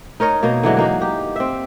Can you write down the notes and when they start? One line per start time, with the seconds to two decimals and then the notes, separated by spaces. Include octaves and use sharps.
0.20 D#4 A#4 C#5 D#5
0.43 B2 A#3 D#4
0.63 D3 E3 F#3 G#3
0.77 A#3 D#4 F#4
1.01 G4
1.36 C4 E5